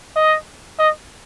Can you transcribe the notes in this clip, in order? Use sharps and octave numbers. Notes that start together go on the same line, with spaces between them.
D#5
D#5